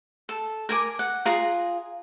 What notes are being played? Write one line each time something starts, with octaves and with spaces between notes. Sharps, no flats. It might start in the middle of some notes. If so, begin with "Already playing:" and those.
A4
A#4 G#5 D6
F#5
F4 G#4 A#5